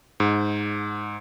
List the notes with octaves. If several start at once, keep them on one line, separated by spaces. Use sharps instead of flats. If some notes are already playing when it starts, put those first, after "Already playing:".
G#2